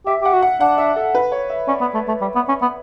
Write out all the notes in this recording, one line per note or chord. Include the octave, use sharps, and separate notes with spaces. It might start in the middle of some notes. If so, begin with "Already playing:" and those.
G4 E5
G4 F#5
F#4
F#5
D4 F#5
E5
A4
B4
C#5
E5
C#4 D5
B3
A3
A3
G3
B3
C#4
B3